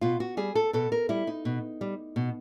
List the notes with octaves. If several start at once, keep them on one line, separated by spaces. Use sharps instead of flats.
B2 F4
F#4
G3 G#4
A4
B2 A4
A#4
G3 E4
D#4
B2
G3
B2